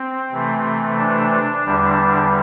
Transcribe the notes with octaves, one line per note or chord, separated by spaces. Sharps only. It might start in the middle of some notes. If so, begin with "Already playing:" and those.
Already playing: C4
C3 E3 A3
D4
E2 D3 G3